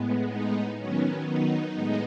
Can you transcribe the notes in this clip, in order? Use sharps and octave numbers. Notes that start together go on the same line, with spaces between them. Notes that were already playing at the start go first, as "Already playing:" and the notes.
Already playing: A2 G#3 B3
D#4
D#3 F#3 B3 C#4
D#4
A2 G#3 B3